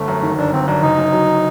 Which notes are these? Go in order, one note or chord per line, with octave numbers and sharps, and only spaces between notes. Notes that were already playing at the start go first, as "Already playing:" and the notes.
Already playing: G1 A3
F#2
D#3
G1 D4
G1 C4
F#2 D4
F#1 D#4
F#2
F#3